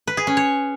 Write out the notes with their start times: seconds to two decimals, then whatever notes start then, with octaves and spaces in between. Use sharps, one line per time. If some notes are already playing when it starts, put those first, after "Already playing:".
0.07 B4
0.17 G#4
0.27 C#4
0.37 C#5